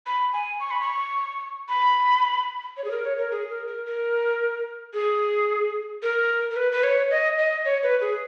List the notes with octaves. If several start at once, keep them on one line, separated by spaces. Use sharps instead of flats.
B5
G#5
C#6
B5
C#6
B5
C#5
G#4
A#4
C#5
A#4
G#4
A#4
A#4
A#4
G#4
A#4
A#4
B4
B4
C#5
D#5
D#5
C#5
B4
G#4